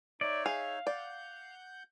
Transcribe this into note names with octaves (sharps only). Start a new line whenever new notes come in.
D#4 C#5 D5 E5
G#4 F5
D5 F#5 G6